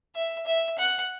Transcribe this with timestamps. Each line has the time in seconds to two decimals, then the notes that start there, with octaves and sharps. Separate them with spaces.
0.15 E5
0.47 E5
0.78 F#5